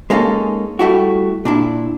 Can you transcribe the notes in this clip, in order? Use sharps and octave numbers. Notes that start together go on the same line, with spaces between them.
G#3 A#3 C#4 D#4 A4
G3 A3 E4 F#4
A#2 D4 E4